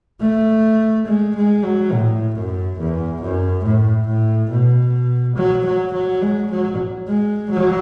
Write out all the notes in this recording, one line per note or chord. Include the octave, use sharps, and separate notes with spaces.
A3
G#3
G#3
F#3
A2
F#2
E2
F#2
A2
A2
B2
F#3
F#3
F#3
G#3
F#3
G#3
F#3